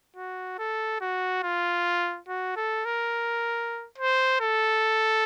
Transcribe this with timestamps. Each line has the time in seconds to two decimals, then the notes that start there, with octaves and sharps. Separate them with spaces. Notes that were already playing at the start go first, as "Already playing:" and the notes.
0.17 F#4
0.59 A4
1.01 F#4
1.44 F4
2.28 F#4
2.57 A4
2.85 A#4
3.99 C5
4.41 A4